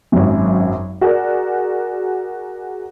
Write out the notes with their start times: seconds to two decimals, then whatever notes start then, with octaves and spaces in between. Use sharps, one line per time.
0.12 G#1 F#2
1.01 F#4 G#4 A#4 D5